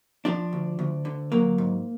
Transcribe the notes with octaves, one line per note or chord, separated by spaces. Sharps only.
F3 D4
D2
D2
D3
F#3 A#3
G#2